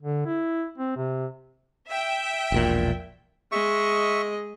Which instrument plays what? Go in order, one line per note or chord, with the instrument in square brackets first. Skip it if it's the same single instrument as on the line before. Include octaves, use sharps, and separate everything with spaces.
[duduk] D3
E4
C4
C3
[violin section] E5 G5
[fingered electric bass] E1 A#1 A#2
[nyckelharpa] G#3 D#5 [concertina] E5 C#6